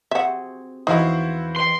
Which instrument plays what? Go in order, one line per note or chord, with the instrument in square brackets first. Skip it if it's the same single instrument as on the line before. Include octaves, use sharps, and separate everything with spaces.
[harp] C4 F#4 G#4 [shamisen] E5 F#5
[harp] E2 E3 F5 [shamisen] D#4 [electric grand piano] E4 F#4 C5
[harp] B4 D#5 G5 [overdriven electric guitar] C6